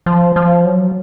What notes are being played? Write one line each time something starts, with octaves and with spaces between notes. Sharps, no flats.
F3
F3
F#3